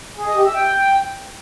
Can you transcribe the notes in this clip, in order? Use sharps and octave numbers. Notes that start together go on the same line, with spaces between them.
G#4
D#5
G4
E5
G5